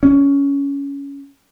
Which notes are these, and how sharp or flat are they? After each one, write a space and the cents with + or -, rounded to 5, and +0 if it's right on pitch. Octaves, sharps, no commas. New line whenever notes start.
C#4 +15